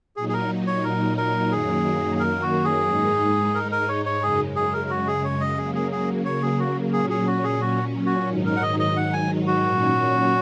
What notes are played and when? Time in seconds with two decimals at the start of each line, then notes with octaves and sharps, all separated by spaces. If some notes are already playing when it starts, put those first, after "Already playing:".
0.16 A#2 F#3 D#4 G#4
0.29 G#4
0.33 A#4
0.67 C#5
0.84 A#4
1.18 A#4
1.51 F#2 D#3 F#3 A#3 G#4
2.20 A#4
2.42 F#4
2.65 G#4
2.87 G#2 G#3 D#4
3.55 A#4
3.72 A#4
3.88 C#5
4.06 C#5
4.22 F#2 C#3 G#3 G#4
4.56 G#4
4.73 A#4
4.90 F#4
5.07 G#4
5.24 C#5
5.41 D#5
5.57 C#3 F#3 A#3 G#4
5.75 G#4
5.92 G#4
6.25 C#5
6.42 G#4
6.59 F#4
6.93 A#2 F#3 C#4 G#4
7.10 G#4
7.27 F#4
7.43 G#4
7.61 F#4
8.06 F#4
8.29 G#2 D#3 F#3 D#4
8.46 A#4
8.56 F#5
8.62 D#5
8.79 D#5
8.97 F#5
9.13 G#5
9.47 F#4
9.64 A#2 F#3 C#4